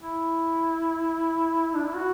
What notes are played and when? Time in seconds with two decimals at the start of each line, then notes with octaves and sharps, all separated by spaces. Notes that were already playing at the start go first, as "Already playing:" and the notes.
0.01 E4
1.75 D4
1.85 E4
1.95 F#4